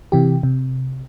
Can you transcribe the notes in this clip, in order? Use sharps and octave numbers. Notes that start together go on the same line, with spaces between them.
C3 E3 G4
C3